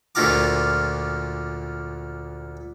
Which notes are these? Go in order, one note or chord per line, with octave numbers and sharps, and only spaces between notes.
D2 A#2 D3 F4 A#4 D6